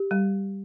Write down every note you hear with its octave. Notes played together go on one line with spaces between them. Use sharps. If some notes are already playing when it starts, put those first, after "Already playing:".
Already playing: G4
G3